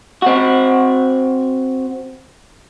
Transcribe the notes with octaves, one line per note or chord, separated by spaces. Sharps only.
C4 F#4